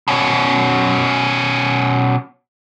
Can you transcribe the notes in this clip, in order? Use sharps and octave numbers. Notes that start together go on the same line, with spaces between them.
B2 C#4